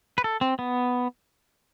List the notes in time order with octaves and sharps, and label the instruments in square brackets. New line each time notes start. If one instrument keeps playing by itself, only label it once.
[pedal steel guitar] B4
A4
C4
B3